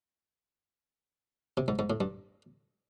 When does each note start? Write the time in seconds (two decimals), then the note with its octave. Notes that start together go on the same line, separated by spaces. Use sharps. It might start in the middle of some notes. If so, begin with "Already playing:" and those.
1.57 C3
1.68 G#2
1.79 G#2
1.90 A2
2.00 G2